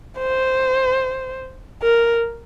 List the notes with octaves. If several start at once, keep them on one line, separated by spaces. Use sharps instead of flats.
C5
A#4